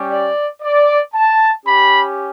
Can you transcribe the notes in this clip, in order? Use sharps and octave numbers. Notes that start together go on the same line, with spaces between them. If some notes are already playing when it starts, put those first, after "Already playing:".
Already playing: G3 C#4 G4
D5
D5
A5
C#4 G4 B5